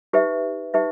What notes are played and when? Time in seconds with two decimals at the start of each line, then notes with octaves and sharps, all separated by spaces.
0.13 D#4 G4 B4 E5
0.74 D#4 G4 B4 E5